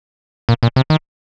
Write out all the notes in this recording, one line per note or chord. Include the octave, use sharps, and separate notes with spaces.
A#2
A#2
C3
D#3